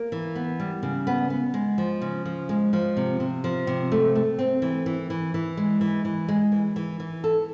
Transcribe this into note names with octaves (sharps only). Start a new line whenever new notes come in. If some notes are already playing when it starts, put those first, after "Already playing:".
Already playing: A#3
E3
B3
G3
C#3
B3
B3
G#3
F3
C#3
F3
G#3
F3
C3
C3
F3
C3
A3
A3
C4
E3
E3
E3
E3
G#3
E3
E3
G#3
E3
E3
E3
A4